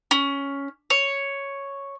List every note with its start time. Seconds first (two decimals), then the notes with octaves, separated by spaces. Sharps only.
0.11 C#4
0.90 C#5